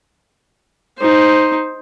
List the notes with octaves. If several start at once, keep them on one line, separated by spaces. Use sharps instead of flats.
D#4 C5